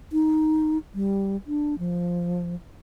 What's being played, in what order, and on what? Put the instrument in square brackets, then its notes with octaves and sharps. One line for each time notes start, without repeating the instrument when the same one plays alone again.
[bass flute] D#4
G3
D4
F3